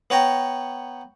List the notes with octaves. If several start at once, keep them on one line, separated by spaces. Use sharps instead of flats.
B3 C#5 G5 A#5